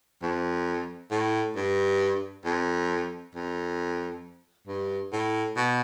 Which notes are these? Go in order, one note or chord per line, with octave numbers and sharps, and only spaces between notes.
F2
A2
G2
F2
F2
G2
A2
B2